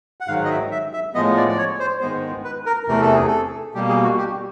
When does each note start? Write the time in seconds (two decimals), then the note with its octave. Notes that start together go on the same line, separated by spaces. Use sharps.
0.20 F#5
0.28 G#2 D#3 F#3 F5
0.45 D#5
0.50 E5
0.72 E5
0.93 E5
1.14 A2 F3 G#3 B3 D#5
1.37 D5
1.48 D5
1.58 C#5
1.80 C5
2.01 G#2 D#3 G#3 B3 C5
2.44 B4
2.66 A#4
2.88 E2 C3 E3 A3 A#4
3.02 A4
3.14 G#4
3.27 A4
3.74 B2 G3 A#3 G4
3.88 G#4
4.03 F#4
4.18 G4